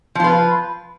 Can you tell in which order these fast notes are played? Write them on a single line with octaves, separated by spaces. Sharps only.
F3 F4 B4